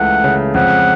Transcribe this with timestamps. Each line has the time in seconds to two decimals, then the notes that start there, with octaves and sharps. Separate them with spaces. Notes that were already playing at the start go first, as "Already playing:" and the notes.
Already playing: C#2 E3 A3 F#5
0.24 C#3
0.54 F2 F#5